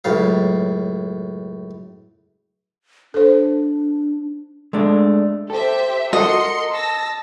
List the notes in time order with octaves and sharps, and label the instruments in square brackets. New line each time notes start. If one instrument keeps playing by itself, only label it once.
[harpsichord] C#2 F#2 A2 F5
[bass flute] D4 [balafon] A4 C5
[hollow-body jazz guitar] G#3 A3 D4
[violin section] G4 C5 E5 [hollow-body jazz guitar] A4
[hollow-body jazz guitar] F#4 A4 [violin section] A#4 C6 C#7 [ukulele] D#5
[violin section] A5 E6 A#6